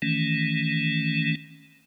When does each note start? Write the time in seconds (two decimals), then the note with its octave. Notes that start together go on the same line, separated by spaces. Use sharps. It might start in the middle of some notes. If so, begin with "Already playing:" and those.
0.02 D#3 E3 A3 C#4